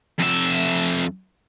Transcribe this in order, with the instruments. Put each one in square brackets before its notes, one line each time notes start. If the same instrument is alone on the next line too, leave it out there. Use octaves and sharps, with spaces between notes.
[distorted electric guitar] F2 E5